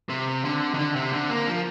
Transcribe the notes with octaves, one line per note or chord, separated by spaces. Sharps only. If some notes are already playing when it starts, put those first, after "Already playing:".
C3
D3
D#3
D3
C3
D3
A#3
F3